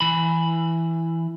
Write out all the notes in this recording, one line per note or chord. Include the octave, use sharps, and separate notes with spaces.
E3 B5